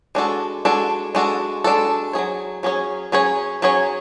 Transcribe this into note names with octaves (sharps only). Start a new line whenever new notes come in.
G#3 D4 F#4 A4
G#3 D4 F#4 A4
G#3 D4 F#4 A4
G#3 D4 F#4 A4
C#4 G#4 C#5
F#3
F#3 C#4 G#4 C#5
F#3 C#4 G#4 C#5
F#3 C#4 G#4 C#5